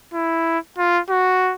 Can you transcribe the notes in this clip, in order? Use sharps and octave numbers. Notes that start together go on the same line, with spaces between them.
E4
F4
F#4